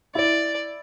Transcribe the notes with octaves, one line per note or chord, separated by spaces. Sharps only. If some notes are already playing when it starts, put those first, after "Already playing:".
E4 D5